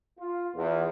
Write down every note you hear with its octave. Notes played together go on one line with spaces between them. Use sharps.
F4
E2